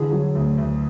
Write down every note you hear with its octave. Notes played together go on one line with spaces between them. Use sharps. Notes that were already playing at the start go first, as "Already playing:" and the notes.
Already playing: D3 E3 G#4
F#3
D2
D2